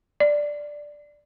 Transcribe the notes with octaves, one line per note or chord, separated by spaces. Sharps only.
D5